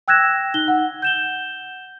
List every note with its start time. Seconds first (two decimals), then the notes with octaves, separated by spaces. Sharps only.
0.08 G5 E6 F#6 G#6 A#6 E7
0.54 D#4 G7
0.68 F#5
1.02 G6 E7 G7